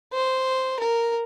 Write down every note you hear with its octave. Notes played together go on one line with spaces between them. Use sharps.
C5
A#4